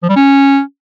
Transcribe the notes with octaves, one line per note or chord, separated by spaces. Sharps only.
F3
G3
C#4